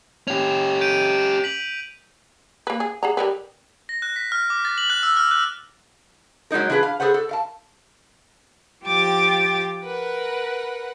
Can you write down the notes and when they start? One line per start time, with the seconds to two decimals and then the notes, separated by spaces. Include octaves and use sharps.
0.28 C#4 G4 F7
0.81 G6 D7 D#7
1.44 B6 F#7
2.67 A#3 B4
2.80 G#4
3.03 G#4 F#5 A#5
3.17 G3 A#4 B4
3.89 A#6
4.02 F#6
4.16 B6
4.32 F6
4.50 D6
4.65 A6
4.78 F#7
4.90 F#6
5.03 E6
5.17 F6
5.31 F#6
6.51 F#3 G#3 A#3 D#4 A#4
6.70 E3 D4 F4 G#4 B4
6.83 F5
7.00 G#4 A4 B4 C5 F#5
7.14 A4
7.29 A#4 F5 A5
8.83 F3 G4 G5 D6 A6
9.84 A#4 B4 F#5